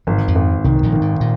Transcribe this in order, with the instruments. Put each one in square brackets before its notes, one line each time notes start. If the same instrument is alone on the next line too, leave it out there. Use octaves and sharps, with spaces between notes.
[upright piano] G#1 [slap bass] F3
[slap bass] D#3
F2 F3
[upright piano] G#1
[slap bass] C2 C3 [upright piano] D#3
[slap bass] A#1 A#2
[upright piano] D#3
[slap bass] G#2
A#2